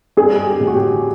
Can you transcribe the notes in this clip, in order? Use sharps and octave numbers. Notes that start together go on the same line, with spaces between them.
G2 G#4
G4
A1
F#4
G4